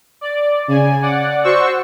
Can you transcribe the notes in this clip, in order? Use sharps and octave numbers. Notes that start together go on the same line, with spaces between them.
D5
C#3 G#5
D5 F#5
F#4 C5 C#6 E6